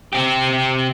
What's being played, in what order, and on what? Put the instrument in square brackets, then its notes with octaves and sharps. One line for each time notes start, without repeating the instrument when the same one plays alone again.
[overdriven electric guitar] C4 G4